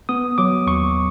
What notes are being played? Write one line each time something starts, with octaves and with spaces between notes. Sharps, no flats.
B3 D#6
F#3 D6
D#2 C#6